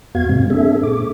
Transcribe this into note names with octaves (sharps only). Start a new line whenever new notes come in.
F2 B3 F#4 F5 G#6
G#2 C3 G#3 C4
A#3 C4 D4 G#4 A4 E5
A#2 D6